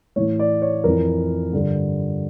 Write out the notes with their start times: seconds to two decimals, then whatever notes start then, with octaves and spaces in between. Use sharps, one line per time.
0.16 A2 E3 C#5
0.39 D5
0.62 C#5
0.84 F2 E3 A#4
1.53 G2 D3